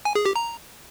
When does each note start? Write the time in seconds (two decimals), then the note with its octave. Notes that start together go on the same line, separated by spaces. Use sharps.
0.05 G#5
0.15 G#4
0.25 G4
0.36 A#5